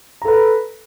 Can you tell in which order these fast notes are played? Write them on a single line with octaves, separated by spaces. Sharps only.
A#5 A4 B4